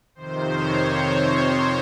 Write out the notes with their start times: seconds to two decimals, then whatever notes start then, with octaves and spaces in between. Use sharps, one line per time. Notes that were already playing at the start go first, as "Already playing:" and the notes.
0.15 F2 C3 D#3 C5
0.50 C#5
0.84 C5